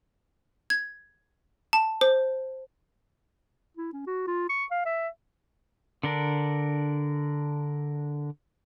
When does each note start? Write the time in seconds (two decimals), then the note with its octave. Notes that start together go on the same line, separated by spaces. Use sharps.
0.70 G#6
1.73 A5
2.01 C5
3.77 E4
3.93 C#4
4.07 F#4
4.27 F4
4.49 C#6
4.71 F5
4.85 E5
6.03 D3 D4 A#4